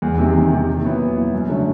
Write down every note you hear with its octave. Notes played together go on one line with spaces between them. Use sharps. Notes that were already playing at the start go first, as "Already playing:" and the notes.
E2
C3 D#3
E2
C3 D#3
A#2
F#3 B3 E4
A#2
F#3 B3 E4
F#2
D3 F#3 A3 C#4